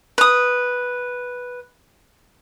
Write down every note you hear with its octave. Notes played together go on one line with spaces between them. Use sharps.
B4 D#6